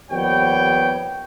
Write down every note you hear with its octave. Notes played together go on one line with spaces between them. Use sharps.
D#2 F3 G3 B3 C#5 G5